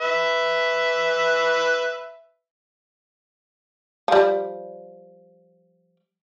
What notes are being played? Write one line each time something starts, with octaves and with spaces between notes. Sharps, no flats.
B4 E5
F3 G3